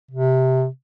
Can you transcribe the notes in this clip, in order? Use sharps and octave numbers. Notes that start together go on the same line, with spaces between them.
C3